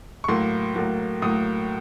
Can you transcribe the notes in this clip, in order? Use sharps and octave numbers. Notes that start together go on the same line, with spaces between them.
C#6
A2 F#3 A#3 C6
A2 F#3 A#3
A2 F#3 A#3 D#6